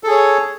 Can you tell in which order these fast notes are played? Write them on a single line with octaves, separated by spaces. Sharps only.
A4 G#4 C#5